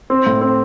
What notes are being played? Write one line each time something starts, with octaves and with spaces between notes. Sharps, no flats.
C4
A2
C4